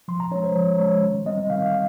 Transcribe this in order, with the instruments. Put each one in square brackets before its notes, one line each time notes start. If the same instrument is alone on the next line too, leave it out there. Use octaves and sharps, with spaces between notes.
[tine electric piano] F3 C6
A#5
C#4 C#5
G#3
C5
F3 C#5
G#3 C#4 C#5
D#3
G3 C4 D#5
D#3 F5
F5